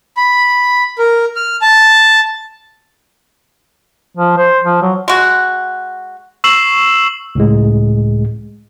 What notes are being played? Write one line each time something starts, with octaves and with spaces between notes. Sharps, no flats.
B5
A#4
F6
A5
F3
C5
F3
F#3
G#3 F#4
C#6 E6 C7 E7 F#7
C#2 A2 G#3